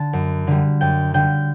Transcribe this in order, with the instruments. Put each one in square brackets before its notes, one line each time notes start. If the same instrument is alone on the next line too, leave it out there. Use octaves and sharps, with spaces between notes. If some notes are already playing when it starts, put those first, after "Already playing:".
Already playing: [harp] D3 A5
F#2
D3 G3
F#2 G5
D3 G3 G5